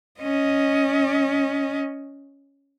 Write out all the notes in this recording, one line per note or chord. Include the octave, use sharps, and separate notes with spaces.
C#4 D#5